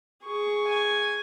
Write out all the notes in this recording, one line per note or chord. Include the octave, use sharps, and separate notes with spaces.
G#4 C#6
G#5